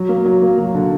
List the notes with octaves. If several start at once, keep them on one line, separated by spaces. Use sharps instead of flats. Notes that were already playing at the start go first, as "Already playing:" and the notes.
Already playing: F#3
A#3
F#3
A#3
F#3
D3